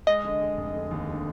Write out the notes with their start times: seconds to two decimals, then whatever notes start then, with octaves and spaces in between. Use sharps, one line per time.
0.07 G#3 D#5
0.25 D3
0.41 G#3
0.57 F1
0.75 D3
0.91 D#2
1.09 D3